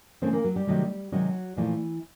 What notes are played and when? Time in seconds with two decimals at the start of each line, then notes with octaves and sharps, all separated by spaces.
0.22 C#3 E3 A3 C4 C5
0.33 A#3 A#4
0.44 F#3 F#4
0.56 G3 G4
0.67 C3 D#3 F#3 A3
1.12 C3 D#3 F#3 G#3 F#4
1.56 A#2 E3 F3 A3 E4